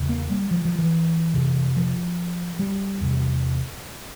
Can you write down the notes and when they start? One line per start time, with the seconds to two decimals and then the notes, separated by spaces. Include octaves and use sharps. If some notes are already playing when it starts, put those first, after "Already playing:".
Already playing: E2 C#3
0.09 A#3
0.30 G3
0.51 F3
0.65 F3
0.79 E3
1.34 F2 C3
1.77 F3
2.59 G3
3.01 E2 C3